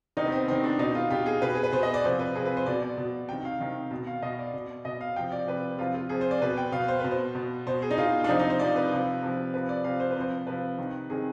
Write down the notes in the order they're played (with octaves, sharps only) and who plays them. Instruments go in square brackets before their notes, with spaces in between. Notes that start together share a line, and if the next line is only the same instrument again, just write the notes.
[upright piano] C3 D#3 D#4
B3
C4
C3 D#3 C4
D4
B2 D#4
F4
B2 G4
G#4
B2 B4
G#4
B4
B2 C5
D#5
D5
C3 F3 C5
B4
C3 G#4
F3
B4
C5
B2 D5
D5
B2
C3 D#3 G5
F5
C3 D#3
B2
F5
B2 D#5
D5
B2
B2 D#5
F5
C3 F3 G5
D5
C3 F3 B4
C3 F3 F4
F4
C3 F3 G#4
C5
D5
B2 B4
G5
B2 F5
C5
B2 B4
C5
B2
B2 C5
G#4
D#4
B2 F4
D4
C3 F3 D#4
D#4
C5
C3 F3 D5
B4
C3 F3
C3 F3
C3 F3 B4
D5
C3 F3 F5
C5
B4
C3 F3 C5
C3 F3 B4
C3 D#3
C3 D#3 G#4